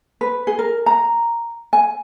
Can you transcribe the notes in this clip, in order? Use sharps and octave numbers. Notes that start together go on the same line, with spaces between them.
B4
G#4
A#4
A#5
G#5